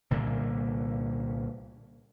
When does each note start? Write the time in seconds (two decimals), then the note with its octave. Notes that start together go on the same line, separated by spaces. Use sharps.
0.11 C2 A#2 D3 A#3